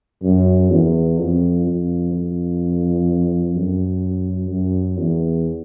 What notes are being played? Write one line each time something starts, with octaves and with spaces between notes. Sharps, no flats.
F#2
E2
F2
F2
F2
F#2
F#2
E2